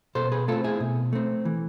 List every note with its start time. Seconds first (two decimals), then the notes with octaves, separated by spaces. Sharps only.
0.15 B2 A4 C5
0.32 G#4 B4
0.48 A3 C4 F4 A4
0.64 E4 G#4
0.80 B2
1.13 A3 C4
1.45 E3